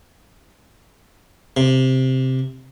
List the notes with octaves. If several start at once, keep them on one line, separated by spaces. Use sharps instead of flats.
C3